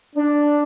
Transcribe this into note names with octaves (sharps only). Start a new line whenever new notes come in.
D4